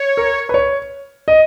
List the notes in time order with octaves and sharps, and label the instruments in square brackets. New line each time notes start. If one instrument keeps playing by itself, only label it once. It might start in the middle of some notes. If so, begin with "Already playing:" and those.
Already playing: [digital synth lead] C#5
[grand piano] A#4
B4
C#5
D#5